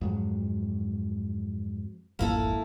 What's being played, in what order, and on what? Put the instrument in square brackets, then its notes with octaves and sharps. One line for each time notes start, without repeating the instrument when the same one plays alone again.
[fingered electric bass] F2 G#2 F#3
[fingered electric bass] D1 G#1 F2 [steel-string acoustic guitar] A#3 E4 A4